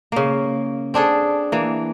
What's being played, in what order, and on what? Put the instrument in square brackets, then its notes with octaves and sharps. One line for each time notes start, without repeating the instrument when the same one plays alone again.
[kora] C#3 A#3
C4 D4 G#4 A4
E3 A#3